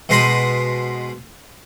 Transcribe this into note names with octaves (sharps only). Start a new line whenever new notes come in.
B2 G#3 C5 D#5 B5 D#6